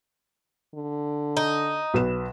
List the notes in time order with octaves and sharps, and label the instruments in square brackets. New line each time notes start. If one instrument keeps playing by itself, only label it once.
[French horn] D3
[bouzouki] D#4
[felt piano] B1 B4 E7